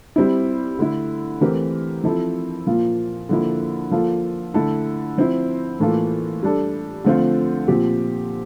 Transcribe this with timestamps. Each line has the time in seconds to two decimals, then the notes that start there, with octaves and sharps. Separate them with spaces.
0.16 G3 C4 E4
0.79 D3 A3 E4
1.41 E3 A3 C4 G4 A#4
2.04 F3 C4 E4 A4
2.67 A#2 F3 A#3 F4
3.29 D3 F3 A#3 E4
3.91 F3 A#3 F4 A4
4.54 D3 A3 E4 A4
5.18 F3 C4 E4
5.80 A2 E3 A#3 F4 A4
6.43 G3 D4 A4
7.04 D3 F3 A3 C4 F4
7.68 A#2 F3 C4 G4